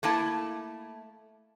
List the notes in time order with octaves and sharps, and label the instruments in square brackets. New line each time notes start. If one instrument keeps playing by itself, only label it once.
[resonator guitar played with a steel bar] A3 A#3 E4 A5